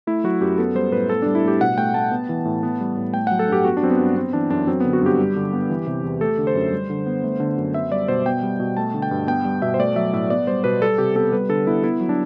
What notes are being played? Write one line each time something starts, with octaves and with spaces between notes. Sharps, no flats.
A3 E4
F#3 F#4
F#2 G4
B3 A4
G3 C5
A2 B4
B3 A4
G3 D4
E4
A2 G4
B2 F#5
A3 G5
A3 A5
B3
E3
A2
B3
G3
A2
A3 G5
F#3 F#5
A4
G2 G4
B3 F#4
D4
F#3 C4
B3
G2
B3 C4
E3 D4
F#2 D4
F#3 C4
D3 B3
F#4
G2 G4
G3
D3
B3
E3
C3
E2
A3 A4
D3
C5
F#2
G3
D3
B3
A3
D3
F#2
B3 E5
G3 D5
B2 C5
B3 G5
G3
B2
A3 A5
D3
G5
G2
B3 G5
G3
B2 E5
C5
A3 D5
F#3 E5
A2 E5
B3 D5
G3 C5
B2 B4
G3 A4
C3 G4
B3 A4
G3 B4
D3 A4
B3 E4
B3 E4
F#3
D4